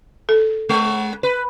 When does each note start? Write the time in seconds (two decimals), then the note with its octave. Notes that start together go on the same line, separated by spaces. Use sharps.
0.29 A4
0.69 G#3
1.23 B4